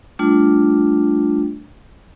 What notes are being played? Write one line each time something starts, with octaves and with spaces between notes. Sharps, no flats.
G3 A3 D4 F4